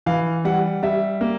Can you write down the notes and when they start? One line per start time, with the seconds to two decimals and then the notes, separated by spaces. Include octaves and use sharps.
0.06 E3 F5
0.45 G3 F#5
0.83 G3 E5
1.21 A#3